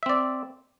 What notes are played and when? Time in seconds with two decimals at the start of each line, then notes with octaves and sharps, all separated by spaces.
0.03 E5
0.06 C4
0.09 D5